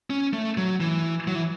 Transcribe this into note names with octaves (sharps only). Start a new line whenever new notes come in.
C#4
A3
F#3
E3
F#3
E3